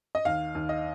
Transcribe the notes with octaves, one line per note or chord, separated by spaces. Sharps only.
D#5
D#2 F5
D#2
D#5